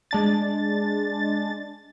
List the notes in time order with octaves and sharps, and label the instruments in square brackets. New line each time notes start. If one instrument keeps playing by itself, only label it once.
[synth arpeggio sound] G#3 D4 A6